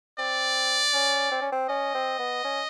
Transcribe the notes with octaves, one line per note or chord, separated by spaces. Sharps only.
C4 D5
C#4
C4
C#4
C4
C#4 D#5
C4
B3
C#4